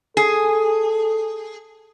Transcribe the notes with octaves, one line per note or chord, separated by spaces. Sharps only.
G#4 A4